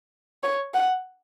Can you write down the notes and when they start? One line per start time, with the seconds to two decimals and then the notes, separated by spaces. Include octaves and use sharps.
0.43 C#5
0.74 F#5